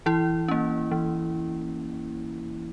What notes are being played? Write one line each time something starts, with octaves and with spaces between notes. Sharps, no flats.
E3 E4
A#3 C#4
E3